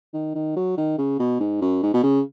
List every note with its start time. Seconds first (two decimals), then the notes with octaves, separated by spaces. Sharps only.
0.14 D#3
0.35 D#3
0.56 F#3
0.77 D#3
0.98 C#3
1.19 B2
1.40 G#2
1.61 F#2
1.83 G#2
1.94 B2
2.03 C#3